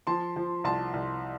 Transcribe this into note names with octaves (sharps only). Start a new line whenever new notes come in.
F3 A5 C6
F3
C2 A5 C6
C2